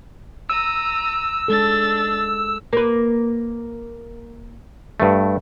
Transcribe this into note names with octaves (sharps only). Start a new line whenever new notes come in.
A#5 E6 D#7
G#3 D4 A4 A6
A#3 B4
G2 A3